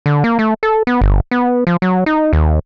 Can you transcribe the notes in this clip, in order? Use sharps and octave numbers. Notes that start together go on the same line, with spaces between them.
D3
A#3
A3
A4
B3
G1
B3
F3
F#3
D#4
D#2